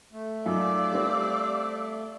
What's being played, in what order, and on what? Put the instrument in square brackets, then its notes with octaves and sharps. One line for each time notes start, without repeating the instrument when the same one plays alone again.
[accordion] A3
[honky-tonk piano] F#2 D#4 F4 [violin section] D5 [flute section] F5 D6 E6
[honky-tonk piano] G3 C4